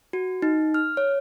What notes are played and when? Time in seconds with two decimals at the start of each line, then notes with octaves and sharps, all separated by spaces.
0.13 F#4
0.42 D#4
0.74 F6
0.97 C#5